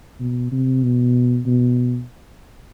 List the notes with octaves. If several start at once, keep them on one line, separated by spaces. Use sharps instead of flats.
B2
C3
B2
B2